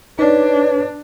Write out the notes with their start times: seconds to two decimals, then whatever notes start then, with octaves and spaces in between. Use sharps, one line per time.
0.19 D4 D#4 B4 C#5 D5